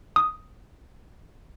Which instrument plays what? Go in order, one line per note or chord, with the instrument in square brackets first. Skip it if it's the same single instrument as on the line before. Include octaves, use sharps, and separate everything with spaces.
[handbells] D#6